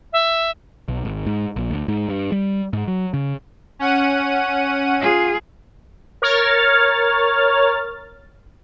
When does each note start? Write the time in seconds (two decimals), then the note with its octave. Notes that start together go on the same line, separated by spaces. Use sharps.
0.12 E5
0.88 B1
1.05 G#1
1.26 G#2
1.56 A#1
1.70 D2
1.88 G#2
2.09 G2
2.32 G3
2.73 G#2
2.88 F#3
3.14 C#3
3.79 C#4 F#5 D#7
5.00 F4 G#4
6.22 A#4 C#5 F6 A6